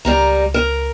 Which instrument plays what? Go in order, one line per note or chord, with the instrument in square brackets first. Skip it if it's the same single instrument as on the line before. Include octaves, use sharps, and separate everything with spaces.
[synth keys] C#2 [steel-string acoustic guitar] G3 A#4 A#5
[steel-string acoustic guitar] A#4